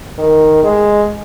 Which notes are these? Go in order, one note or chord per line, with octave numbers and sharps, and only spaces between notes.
D#3
G#3